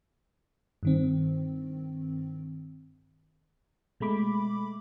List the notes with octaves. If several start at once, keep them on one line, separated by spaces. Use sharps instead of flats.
G2 D#3 C4
B2 G#3 A3 B5 D6